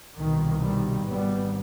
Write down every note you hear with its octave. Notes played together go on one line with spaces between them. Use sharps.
C2 B2 D#3
D#3 G3
G#1 G#2 G3 B3